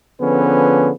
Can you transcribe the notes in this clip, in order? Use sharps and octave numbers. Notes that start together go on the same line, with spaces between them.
D3 F3 B3 C#4 G#4 B4